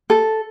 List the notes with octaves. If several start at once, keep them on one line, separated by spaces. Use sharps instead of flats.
A4